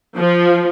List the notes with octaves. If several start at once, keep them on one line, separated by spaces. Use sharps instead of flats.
F3